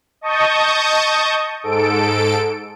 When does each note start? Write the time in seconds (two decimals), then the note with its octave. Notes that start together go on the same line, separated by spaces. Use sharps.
0.21 D#5 A5 C#6 D#6 G6
1.63 G#2 A4 D7